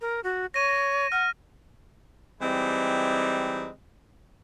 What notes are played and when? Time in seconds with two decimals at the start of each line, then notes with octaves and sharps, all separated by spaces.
0.01 A#4
0.24 F#4
0.54 C#5 A#6 D#7
0.69 A#6
1.12 F#5 F6
2.41 E3 G3 G#3 C4 D#4